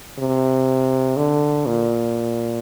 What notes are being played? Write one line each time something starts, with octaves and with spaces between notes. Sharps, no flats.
C3
D3
A#2